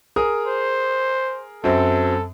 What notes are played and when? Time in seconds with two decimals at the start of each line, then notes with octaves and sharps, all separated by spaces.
0.16 G#4 A#4 D#6
0.47 C5
1.64 F#2 F#3 C4 A4